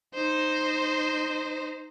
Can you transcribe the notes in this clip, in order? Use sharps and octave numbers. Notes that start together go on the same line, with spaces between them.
D#4 C5